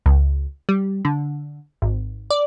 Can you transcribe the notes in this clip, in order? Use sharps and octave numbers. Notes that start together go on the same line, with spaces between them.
C#2
G3
D3
G#1
D5